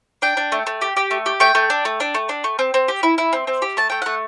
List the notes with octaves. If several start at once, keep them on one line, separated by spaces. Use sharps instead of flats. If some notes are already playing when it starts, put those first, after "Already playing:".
D4 G5
D4
A3
A3
G4
G4
A3
G4
A3 G5
A3
D4
A3
D4
A3
D4
A3
C4
C4
G4
E4
E4
C4
C4
G4
A3 A5
A3 G5
A3 F#5